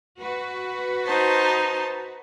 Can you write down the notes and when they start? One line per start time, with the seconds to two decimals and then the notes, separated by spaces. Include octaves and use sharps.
0.21 F#4 B4
1.05 D#4 C5 A5